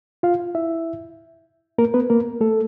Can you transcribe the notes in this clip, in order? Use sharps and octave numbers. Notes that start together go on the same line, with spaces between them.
F4 F5
E4 E5
A#3 A#4
B3 B4
A#3 A#4
A3 A4